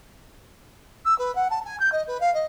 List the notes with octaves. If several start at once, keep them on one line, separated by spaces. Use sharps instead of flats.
E6
B4
F#5
A5
G#5
G6
D#5
B4
F5
D#5